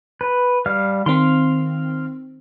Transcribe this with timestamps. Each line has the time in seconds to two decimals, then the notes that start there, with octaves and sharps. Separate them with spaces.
0.21 B4
0.66 G3 F5 F6
1.06 D#3 C4 F5 C6